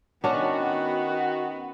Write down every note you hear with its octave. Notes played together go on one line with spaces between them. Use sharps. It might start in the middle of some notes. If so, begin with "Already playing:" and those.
D#3 B3 C#4 D4 F#4